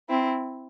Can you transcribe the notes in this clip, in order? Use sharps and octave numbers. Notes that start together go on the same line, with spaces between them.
C4 E4